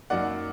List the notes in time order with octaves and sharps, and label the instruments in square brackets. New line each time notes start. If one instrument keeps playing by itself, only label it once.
[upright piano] F#2 F#3 A#3 D#4 D5 F#5